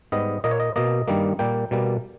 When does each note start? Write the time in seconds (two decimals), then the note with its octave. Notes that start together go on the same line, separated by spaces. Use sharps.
0.12 G#2 G3 B3 D#5
0.44 A#2 A#3 D#5
0.51 C#5
0.60 D#5
0.76 B2 A#3 D#5
1.08 G2 D#3 G3 A#3
1.39 A#2 G3 A#3 G5
1.71 B2 G3 A#3